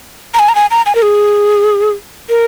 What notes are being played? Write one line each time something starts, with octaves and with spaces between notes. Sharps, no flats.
A#5
G#5
A#5
G#5
A#5
G#5
A#4
G#4
A#4